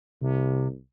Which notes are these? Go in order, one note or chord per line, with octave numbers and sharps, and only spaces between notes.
C2 C3